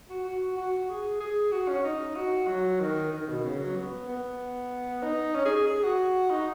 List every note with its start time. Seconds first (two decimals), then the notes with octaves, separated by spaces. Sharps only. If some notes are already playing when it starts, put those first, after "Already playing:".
0.10 F#4
0.24 F#4
0.57 F#4
0.89 G#4
1.20 G#4
1.52 F#4
1.68 C#4
1.84 D#4
2.16 F#4
2.48 F#3
2.80 D#3
3.13 D#3
3.29 B2
3.44 C#3
3.59 F#3
3.76 B3
4.08 B3
5.03 D#4
5.35 C#4
5.45 G#4
5.56 G#4
5.67 G#4
5.83 F#4
6.30 D#4